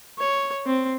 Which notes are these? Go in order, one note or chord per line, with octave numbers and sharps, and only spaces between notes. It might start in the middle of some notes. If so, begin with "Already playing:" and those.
C#5
C4